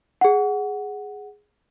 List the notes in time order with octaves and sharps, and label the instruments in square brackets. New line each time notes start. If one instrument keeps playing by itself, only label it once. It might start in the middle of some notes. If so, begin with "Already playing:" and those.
[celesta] G#4 F#5